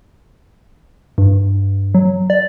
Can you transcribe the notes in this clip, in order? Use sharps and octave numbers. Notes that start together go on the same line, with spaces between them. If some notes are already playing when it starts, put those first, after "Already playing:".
G2
F#3
D5